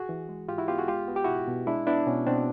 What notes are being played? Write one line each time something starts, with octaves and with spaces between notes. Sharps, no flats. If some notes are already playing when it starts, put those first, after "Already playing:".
Already playing: F#4 G#4
E3
G#3
G#2 F4 G4
E4 F#4
B3 F4 G4
F#4 G#4
G#3 F4 G4
B3 F#4
G4
B2 E4 F#4
B2
G#3 D4 E4
B3 D4 E4
B2 C#4
B2 C4 D4